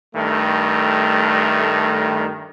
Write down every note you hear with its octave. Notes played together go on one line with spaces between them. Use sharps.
G2 D#3 A3